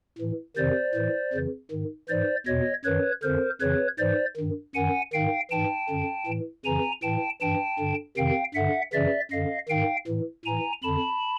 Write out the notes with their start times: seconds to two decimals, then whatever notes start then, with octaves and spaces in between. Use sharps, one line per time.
0.18 A2 E3
0.57 F2 C3 D#3 C5 D5
0.95 A2 E3
1.33 F2 C#3 E3
1.71 G#2 D#3
2.09 G#2 E3 C5 D5
2.46 E2 B2 C#5 D#5
2.84 F#2 D#3 B4 C#5
3.23 F2 D3 A#4 C5
3.61 F2 C#3 E3 B4 C#5
3.98 G#2 E3 C5 D5
4.37 G2 D#3
4.75 F#2 D#3 F#5 G#5
5.13 G#2 D#3 F5 G5
5.51 G#2 E3 G5 A5
5.90 F#2 D3
6.27 A2 E3
6.65 F2 C#3 E3 G#5 A#5
7.03 A2 E3 G5 A5
7.41 G2 E3 G5 A5
7.79 G2 D3
8.17 F2 C3 D#3 F5 G5
8.55 G2 D3 E5 F#5
8.93 F#2 C#3 E3 D5 E5
9.31 F#2 D3 D#5 F5
9.69 G#2 D#3 F5 G5
10.07 A2 E3
10.45 A2 E3 G#5 A#5
10.83 F2 D3 A5 B5